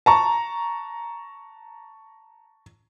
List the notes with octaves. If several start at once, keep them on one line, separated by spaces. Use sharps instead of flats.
A5 A#5 C#6